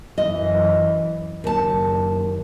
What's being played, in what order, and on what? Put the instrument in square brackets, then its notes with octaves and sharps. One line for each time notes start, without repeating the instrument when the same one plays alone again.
[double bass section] F#2 E3 [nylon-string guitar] D#5
[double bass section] F#1 [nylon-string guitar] D#2 A5